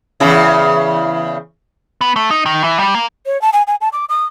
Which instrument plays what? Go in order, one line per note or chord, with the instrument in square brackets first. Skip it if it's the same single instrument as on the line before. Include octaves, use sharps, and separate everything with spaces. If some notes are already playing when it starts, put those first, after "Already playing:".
[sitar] E2 C#3 E4
[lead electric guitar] B3
A3
D#4
D#3
E3
G3
A#3
[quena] C#5
A5
G#5
G#5
A5
D6
D#6